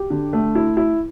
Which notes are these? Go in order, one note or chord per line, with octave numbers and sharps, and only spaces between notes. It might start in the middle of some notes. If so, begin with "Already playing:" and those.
Already playing: G4
D3
A3
E4
E4